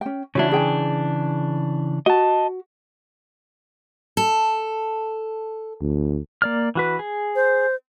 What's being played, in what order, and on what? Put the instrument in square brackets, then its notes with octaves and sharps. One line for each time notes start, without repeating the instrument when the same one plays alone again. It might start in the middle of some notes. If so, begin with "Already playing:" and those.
[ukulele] C#4 G5
[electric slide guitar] C#3 E3 D4 [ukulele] E4 F#4 C#5
[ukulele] G#4 G5 G#5
[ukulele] F#4 [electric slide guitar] D#5 A5
[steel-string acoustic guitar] A4
[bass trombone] D2
[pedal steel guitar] A#3 D5 F6
E3 F#4 B4
G#4
[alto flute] C5